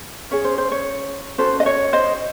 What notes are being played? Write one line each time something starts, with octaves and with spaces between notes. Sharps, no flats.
C#4 G#4 C#5
C5
C5
C#5
C#4 F#4 A4 C5
D#5
C#5
C5 D#5